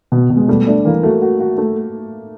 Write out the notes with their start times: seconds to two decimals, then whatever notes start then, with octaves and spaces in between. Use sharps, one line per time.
0.12 B2
0.30 B2
0.37 G#3
0.48 G3 A3
0.67 A3 D4
0.85 E3 A#3
1.03 A3 F#4
1.22 F#4
1.40 F#4
1.58 A3